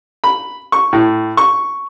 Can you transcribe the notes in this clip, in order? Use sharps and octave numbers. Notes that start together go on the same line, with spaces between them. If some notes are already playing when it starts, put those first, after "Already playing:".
B5
C#6
A2
C#6